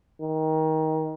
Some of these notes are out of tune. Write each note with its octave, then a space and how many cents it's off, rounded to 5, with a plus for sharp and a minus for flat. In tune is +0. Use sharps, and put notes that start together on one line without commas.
D#3 +20